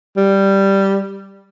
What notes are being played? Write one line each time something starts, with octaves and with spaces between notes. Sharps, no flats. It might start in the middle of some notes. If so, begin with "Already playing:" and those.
G3